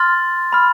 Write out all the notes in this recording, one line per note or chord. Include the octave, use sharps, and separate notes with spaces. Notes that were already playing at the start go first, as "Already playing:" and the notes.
Already playing: C6 F6 A6
B5 F6